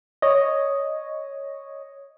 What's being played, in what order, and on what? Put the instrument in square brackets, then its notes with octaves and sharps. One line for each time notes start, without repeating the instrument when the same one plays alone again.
[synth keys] C#5 D#5